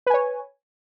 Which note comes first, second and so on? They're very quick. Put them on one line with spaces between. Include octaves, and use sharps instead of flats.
B4 G#5 C#5